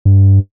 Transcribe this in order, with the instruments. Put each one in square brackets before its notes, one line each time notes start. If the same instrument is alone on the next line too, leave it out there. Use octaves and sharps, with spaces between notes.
[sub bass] G2